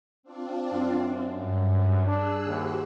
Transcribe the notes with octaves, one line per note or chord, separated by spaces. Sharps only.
C4 D4 F4
F#2
G2
D4 G#4 E6 F#6
D#2 F#4 G4 C5